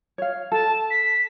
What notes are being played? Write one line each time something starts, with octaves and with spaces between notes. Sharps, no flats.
C#5 F5
A4 A5
B6